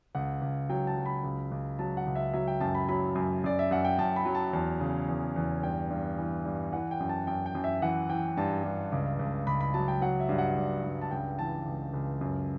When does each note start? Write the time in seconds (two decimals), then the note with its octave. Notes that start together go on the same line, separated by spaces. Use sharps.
0.15 C#2 F#5
0.42 C#2
0.69 F#3 G5
0.87 A5
0.97 F#3
1.06 B5
1.24 C#2
1.52 C#2
1.79 F#3 A5
1.97 F#5
2.06 C#2
2.15 E5
2.34 F#3 E5
2.47 G5
2.60 F#2 A5
2.75 B5
2.88 F#3 B5
3.15 F#2
3.44 F#2 D5
3.59 E5
3.71 F#2 F#5
3.85 G5
3.98 F#2 A5
4.16 B5
4.26 F#3
4.35 A5
4.53 E2 A5
4.80 C#3
5.08 E2
5.36 E2
5.63 G2 G5
5.90 G2
6.18 E3
6.45 G2
6.73 E3 F#5
6.91 G5
7.00 F#2
7.09 A5
7.27 F#2 G5
7.46 G5
7.55 F#2
7.64 E5
7.82 E3 F#5
8.09 E3 G5
8.37 G2 A5
8.64 G2
8.92 C#2
9.19 C#2
9.47 C#2 B5
9.61 B5
9.74 F#3 A5
9.88 G5
10.02 F#3 F#5
10.20 E5
10.29 G2
10.38 F#5
10.57 G2
10.84 G2
11.01 A5
11.11 C#2 G5
11.39 E3 A5
11.66 C#2
11.94 C#2
12.21 F#2